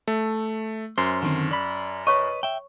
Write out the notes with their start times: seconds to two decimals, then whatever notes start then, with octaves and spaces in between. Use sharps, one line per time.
0.08 A3
0.98 F#2 C5
1.22 D3 D#3 C4
1.51 D5 B5
2.07 B4 C#5 D#5 C#6
2.43 E5 G5